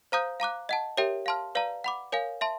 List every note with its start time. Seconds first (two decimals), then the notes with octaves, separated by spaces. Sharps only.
0.12 C5 F5 A#5 D#6 G6
0.40 F5 A#5 D6 F#6
0.69 D#5 F#5 A5
0.97 G4 A#4 C#5 E5 G5
1.26 F5 A5 C6 F6
1.55 B4 D5 F5 A#5
1.84 F#5 B5 D6
2.12 A#4 C#5 F5 G#5
2.41 E5 A5 C6